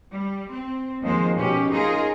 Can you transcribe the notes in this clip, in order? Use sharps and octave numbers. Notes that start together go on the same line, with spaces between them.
G3
C4
D#2 D#3 F3 G#3 C5
B2 G#3 C#4 G4
C#4 D#4 F4 G#4 A#4